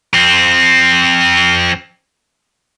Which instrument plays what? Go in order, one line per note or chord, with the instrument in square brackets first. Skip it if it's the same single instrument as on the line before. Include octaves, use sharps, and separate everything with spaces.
[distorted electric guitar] F2 C4